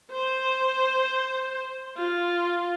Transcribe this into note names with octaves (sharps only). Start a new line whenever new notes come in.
C5
F4